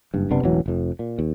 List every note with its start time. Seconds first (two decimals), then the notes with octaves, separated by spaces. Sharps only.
0.14 F#1 G2
0.30 F#1 C3 B3 D4
0.43 E1 A1 E3 F#3
0.66 F1 F2
0.99 A#2
1.19 D#2